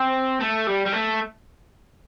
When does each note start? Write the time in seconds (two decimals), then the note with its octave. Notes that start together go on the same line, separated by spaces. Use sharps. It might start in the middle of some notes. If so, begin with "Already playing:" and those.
Already playing: C4
0.41 A3
0.67 G3
0.86 G3
0.92 A3